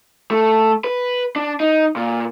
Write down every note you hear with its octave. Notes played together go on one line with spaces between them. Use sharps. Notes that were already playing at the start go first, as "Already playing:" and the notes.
A3
B4
D4
D#4
A#2